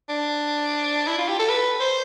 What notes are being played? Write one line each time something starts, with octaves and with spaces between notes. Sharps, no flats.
D4
E4
F4
G4
A4
B4
C5